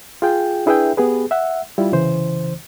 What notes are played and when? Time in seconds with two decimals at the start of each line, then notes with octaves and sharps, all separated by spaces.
0.22 F4 G#4 G5
0.66 D4 E4 G#4 B4 E5 G5
0.97 B3 G4 G#4 B4
1.31 E5 F#5
1.78 G3 E4 F4
1.92 C2 C#3 E3 C5